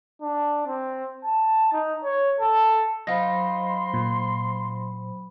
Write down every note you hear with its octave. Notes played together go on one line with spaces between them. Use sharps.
D4
C4
A5
D#4
C#5
A4
F#3 D#4 F4 C5 D#5 B5 C6
A#2